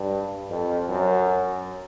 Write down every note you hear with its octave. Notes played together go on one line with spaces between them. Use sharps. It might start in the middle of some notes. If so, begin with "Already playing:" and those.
Already playing: G2
F2
F#2